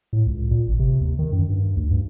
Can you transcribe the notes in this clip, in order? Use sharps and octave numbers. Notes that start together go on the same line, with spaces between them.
A2
C#2
A#2
G#1
C3
D#2
D#3
F#2
G2
D2
G2